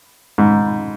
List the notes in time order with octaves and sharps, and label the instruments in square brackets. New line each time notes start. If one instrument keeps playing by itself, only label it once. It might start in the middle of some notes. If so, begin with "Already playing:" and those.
[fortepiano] G#2